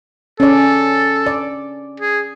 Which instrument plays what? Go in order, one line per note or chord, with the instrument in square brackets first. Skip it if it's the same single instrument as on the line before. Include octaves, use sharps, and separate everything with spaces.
[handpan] C#4 D5 [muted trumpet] A4
[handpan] D5
[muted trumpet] G#4